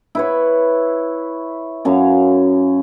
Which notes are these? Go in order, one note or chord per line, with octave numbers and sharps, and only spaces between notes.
E4 B4 C#5
F#2 C#4 F5